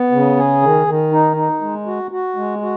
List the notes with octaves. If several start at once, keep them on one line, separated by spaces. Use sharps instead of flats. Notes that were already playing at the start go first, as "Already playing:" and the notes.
Already playing: B3
C#3
G#4
D#3
D#3
D#4
D#4
G#3
F#4
F#4
G#3
F#4